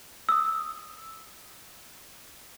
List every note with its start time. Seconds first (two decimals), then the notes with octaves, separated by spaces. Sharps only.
0.29 D#6 E6